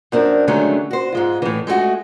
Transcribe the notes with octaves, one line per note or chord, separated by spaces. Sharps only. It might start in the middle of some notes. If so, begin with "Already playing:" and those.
F#2 C4 D4 A#4
D3 D#3 F#3 G#3 A3 C#4
F#4 C5
G#2 G#3 F4
A2 E3
G#3 A3 C#4 F#4 G#4